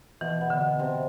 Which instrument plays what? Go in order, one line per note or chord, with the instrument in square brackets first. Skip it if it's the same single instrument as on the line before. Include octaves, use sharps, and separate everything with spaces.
[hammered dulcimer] B2 [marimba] E3
[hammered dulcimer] B3
[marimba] D3
[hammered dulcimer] B2
C3